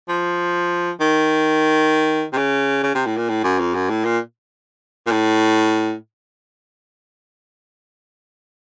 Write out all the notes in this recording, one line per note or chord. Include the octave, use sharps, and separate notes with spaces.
F3
D#3
C3
C#3
C#3
C3
A2
A#2
A2
F#2
F2
F#2
A2
A#2
A#2
A2